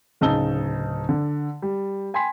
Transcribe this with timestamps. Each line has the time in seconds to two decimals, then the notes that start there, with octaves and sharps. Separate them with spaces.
0.21 D1 C#3 D#4 A5 E6 G7
1.09 D3
1.62 G3
2.14 G5 G#5 B5 C6 B6